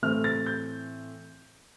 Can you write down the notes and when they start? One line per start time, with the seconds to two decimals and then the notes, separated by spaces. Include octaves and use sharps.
0.02 A2 E3 A3 C4 F6
0.24 A6
0.46 G6